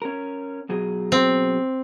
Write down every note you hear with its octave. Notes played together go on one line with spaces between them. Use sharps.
C#4 A#4
B2 F#3 G#4
C4